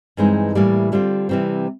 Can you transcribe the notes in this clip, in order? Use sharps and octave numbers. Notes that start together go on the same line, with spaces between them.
G2 E3 G#3 C4 D#4
A2 E3 G3 A#3
D3 G3 C4 F4
C3 E3 G3 C4